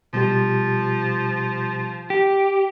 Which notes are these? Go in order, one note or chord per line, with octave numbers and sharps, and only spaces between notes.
B2 F3 G3 G4
G4